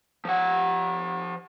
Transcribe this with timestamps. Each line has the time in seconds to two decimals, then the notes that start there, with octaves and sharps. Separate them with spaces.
0.25 F3 F#5